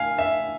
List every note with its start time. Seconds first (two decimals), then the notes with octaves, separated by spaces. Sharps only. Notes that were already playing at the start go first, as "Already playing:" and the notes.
Already playing: F5 G#5
0.18 E5